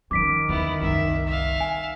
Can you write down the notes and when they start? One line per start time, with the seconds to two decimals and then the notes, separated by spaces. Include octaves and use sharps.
0.11 D#3 F3 C#4 D6 B6 D7
0.49 D#2 B3 E4
0.81 F#1 C2 E5
1.27 E5 F5
1.60 G#5